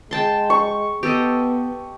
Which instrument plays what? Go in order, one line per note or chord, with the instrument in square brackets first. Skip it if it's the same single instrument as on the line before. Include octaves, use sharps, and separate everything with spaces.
[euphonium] G#3 [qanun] G5 A5 C6
[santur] C#6
[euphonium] B3 [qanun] G4 A4 D#5